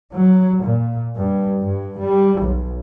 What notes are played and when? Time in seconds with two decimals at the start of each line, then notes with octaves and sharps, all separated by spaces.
0.13 F#3
0.61 A#2
1.17 G2
1.61 G2
2.01 G3
2.42 B1